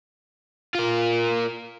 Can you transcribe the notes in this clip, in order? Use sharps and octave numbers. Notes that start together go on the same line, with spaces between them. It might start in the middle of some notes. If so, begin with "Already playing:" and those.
F4 A#4